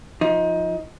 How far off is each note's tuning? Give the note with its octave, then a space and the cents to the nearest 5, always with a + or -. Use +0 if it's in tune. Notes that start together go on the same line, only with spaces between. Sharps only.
F3 +10 D#4 +25